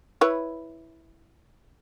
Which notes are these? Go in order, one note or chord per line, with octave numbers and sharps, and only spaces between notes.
E4 B4 C#5